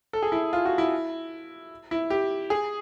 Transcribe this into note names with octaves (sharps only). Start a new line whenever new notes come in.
A4
G#4
E4
F4
F#4
E4
E4
G4
G#4